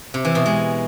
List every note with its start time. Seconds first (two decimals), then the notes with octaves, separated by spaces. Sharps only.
0.14 C3
0.25 E3
0.35 B2
0.46 G#3